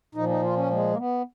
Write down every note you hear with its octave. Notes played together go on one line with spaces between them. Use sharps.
A#2 F3 D#4
D#4
F4
C#4
G#3
A#3
B3